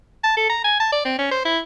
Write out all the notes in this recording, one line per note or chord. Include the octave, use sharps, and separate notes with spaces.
A5
A4
A#5
G#5
A5
D5
C4
C#4
C5
E4